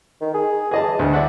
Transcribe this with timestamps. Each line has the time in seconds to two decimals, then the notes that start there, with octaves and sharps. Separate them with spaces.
0.21 D#3
0.34 G#4
0.71 E3 G#4 D#5 A5
0.99 D2
1.13 D5 E5 F#5